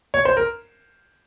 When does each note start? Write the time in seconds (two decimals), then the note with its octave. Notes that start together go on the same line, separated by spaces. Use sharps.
0.14 C#5
0.25 C5
0.37 A#4